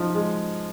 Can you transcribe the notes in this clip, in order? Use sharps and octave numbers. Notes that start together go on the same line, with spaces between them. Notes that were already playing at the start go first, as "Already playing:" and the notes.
Already playing: F3 D#4
G#3